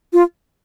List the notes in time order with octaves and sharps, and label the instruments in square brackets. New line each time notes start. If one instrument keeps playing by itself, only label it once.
[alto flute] F4